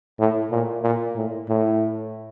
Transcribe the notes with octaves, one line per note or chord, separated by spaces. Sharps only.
A2
A#2
A#2
A2
A2